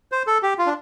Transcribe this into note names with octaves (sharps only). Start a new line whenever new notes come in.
C5
A4
G4
F4
D4